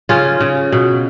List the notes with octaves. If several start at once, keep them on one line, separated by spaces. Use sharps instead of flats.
C#3 C#4 F4
C#3
B2